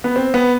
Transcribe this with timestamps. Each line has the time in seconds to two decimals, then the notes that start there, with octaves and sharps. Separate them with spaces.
0.04 B3
0.16 C4
0.34 B3